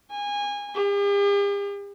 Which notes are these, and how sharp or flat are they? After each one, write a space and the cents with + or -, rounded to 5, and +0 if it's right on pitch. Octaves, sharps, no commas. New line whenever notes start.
G#5 -25
G4 +45